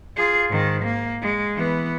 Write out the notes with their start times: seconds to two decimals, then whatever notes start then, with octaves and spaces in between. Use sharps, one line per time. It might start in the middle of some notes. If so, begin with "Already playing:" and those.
0.16 F4 G#4
0.49 G#2 D#3
0.84 A#3
1.22 G#3
1.55 E3 B3